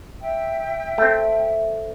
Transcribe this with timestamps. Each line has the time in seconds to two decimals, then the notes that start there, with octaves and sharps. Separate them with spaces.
0.22 E5 G5
0.98 A3 C4